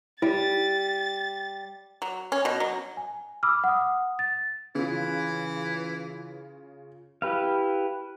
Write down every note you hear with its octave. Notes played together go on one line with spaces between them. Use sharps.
G3 E4 A6
F#3
C#4
B2
F#3
G#5
B5 D6 E6 F6
F#5 D#6
A6
C#3 E3 F4
E4 G4 B4 F5